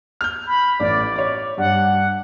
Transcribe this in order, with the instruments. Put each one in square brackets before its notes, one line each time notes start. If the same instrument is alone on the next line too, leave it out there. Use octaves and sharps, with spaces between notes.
[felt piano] F6 G6
[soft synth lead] B5
[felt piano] A1 D6 [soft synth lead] D5
[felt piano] C#5 D6
[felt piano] G2 [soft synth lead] F#5